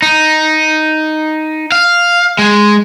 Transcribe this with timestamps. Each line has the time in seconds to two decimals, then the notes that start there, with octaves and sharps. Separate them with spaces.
0.02 D#4
1.72 F5
2.39 G#3